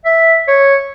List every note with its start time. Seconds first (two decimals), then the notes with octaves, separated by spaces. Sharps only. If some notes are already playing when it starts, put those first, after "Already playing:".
0.05 E5
0.48 C#5